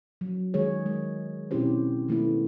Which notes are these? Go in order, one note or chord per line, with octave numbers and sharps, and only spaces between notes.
F#3
D#3 G#3 G#4 C#5
G#3
B2 C4 C#4 E4 G4 C5
D#3 A3 B3 E4